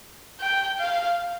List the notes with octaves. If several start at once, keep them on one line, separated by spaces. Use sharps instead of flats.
G5
F5